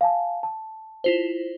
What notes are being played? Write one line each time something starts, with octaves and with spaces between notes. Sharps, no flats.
F5 G#5 A5
A5
E4 F4 C5